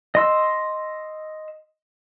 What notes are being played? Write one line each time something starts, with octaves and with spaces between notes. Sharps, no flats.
D#5 C6 E6